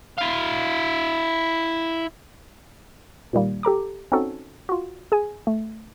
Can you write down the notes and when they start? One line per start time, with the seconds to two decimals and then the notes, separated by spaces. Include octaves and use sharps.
0.18 E4 F5
3.33 A#2 D#3 G3 A#3
3.63 G4 A4 A#5 D6
4.12 C4 C#4 D#4 F#4 A4
4.69 F4 F#4
5.12 G#4 G#5
5.47 A3